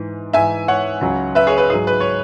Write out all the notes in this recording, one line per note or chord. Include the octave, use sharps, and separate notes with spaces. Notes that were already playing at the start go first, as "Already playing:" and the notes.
Already playing: G#2 E3
G#2 E3 E5 G#5
C#5 F#5
C#2 C#3 F#3
B4 E5
G#4 C#5
B4
G#2 F#3 G#4
B4
C#5